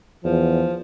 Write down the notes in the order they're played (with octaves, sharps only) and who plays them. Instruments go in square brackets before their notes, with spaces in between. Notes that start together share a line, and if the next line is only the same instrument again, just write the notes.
[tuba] E2 [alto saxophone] F3